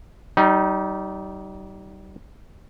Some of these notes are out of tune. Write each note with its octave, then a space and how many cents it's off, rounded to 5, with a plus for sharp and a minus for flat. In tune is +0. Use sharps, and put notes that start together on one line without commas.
G3 -30 D#4 +0